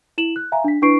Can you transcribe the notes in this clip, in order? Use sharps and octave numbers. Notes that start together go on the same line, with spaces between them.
E4 E7 F#7
F#6
E5 F5 G#5 A#5
D4 B6
D4 E4 B4 C#6 C7 D7